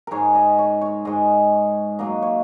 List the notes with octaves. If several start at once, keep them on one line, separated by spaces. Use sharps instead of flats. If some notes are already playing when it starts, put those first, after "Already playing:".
G#2 G#3 A#4 C#5
D#5
C#5
C#5
G#2 G#3 D#5
A#2 F#3 A#3 D#5
C#5